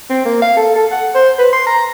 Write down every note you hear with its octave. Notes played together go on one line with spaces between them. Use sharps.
C4
A#3
F5
A4
A4
F#5
C5
B4
C6
A#5